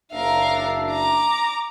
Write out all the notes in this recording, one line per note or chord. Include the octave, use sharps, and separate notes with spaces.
F#1 D4 A#4 E5 F5
A#5 D6